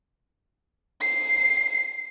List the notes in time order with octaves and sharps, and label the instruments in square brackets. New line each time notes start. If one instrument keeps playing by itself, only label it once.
[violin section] C7